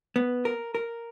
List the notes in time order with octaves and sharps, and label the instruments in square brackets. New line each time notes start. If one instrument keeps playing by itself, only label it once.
[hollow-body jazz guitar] B3
A#4
A#4